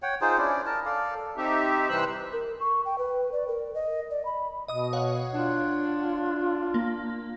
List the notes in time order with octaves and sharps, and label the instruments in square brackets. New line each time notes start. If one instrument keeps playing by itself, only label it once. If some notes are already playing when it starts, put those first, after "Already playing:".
[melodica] C#5 F#5 G5
D#4 F4 G#4 C5
C#4 D4 E4 D5
A#4 A5
A4 D5 F5
[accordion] C4 D#4 G4 E5
C3 E3 G3 C5 E6 F#6
[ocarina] A#4
C#6
G5
B4
D5
A#4
D#5
D5
B5
[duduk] B2 [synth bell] D#5 D#6
[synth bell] C#5 F5 F#5
[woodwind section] D4 [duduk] F4
[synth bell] A#3